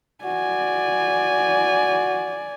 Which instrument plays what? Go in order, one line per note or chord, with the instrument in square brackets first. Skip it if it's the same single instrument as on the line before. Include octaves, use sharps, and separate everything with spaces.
[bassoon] F#4 [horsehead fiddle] D5 G#5